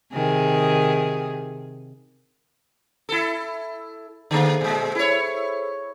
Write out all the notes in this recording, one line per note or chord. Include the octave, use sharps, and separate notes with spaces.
C3 D#3 G#4
E4 A4
D3 A#3 G#4 A4 C5
A#2 G#3
E4 C#5